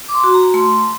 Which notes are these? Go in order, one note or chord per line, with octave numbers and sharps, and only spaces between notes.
D6
C6
F#4
A#5
A3 C6